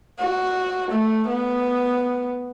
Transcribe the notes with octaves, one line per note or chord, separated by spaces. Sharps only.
F#4
A3
B3